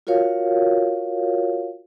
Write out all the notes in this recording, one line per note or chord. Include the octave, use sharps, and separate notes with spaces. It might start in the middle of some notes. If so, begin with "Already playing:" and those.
F4 F#4 A#4 C#5 F5